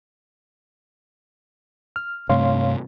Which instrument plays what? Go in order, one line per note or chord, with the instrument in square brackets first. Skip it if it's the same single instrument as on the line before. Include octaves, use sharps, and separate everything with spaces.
[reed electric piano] F6
[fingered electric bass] G2 C3 A3 [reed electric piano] C#5 F5 C6